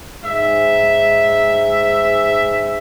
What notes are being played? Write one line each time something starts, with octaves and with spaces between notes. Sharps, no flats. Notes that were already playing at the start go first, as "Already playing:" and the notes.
G#2 E5